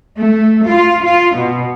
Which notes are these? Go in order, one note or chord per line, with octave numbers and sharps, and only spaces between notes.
A3
F4
F4
B2